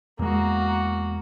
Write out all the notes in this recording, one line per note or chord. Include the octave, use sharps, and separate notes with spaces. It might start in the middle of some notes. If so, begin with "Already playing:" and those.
E2 G#3 A#3 F#4